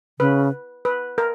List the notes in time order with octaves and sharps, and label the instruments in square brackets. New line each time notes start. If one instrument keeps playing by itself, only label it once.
[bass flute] C#3 [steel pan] B4
[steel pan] B4
A#4